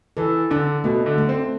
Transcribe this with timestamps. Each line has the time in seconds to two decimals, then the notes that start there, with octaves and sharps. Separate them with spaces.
0.17 E3 A4
0.50 D3 D4
0.84 B2 A3
1.06 D3
1.18 A3
1.29 C4